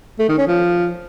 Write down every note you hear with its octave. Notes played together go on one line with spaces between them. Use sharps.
A3
D#3
C#4
F3